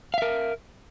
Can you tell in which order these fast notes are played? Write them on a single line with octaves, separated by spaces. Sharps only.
F5 E5 A#4